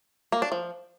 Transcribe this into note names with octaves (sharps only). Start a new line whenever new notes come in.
A#3
D4
F3